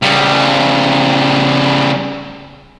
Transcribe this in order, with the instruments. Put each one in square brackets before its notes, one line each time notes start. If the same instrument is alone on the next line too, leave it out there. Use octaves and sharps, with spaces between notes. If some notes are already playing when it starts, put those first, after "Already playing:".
[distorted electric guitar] C#3 G3